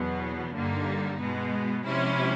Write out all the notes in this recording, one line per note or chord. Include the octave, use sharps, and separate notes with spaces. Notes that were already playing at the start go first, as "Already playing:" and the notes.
Already playing: E2 B2 F#3 B3
G2 D3 G3 A#3 D#4
B2 G#3 B3
C3 F3 G#3 C#4 E4